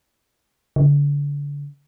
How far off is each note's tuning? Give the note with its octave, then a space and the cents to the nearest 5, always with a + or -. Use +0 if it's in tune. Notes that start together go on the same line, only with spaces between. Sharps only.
D3 -35